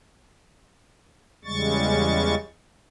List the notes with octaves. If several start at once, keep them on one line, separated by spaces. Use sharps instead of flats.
E2 C#3 G3 G#3 C#6 A6